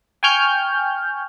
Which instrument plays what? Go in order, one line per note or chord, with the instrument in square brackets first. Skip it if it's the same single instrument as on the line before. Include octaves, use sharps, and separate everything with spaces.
[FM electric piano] G5 G#5 C#6 F6 G6